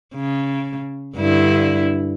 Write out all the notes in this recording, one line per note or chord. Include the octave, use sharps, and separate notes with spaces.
C#3
G2 D3 E4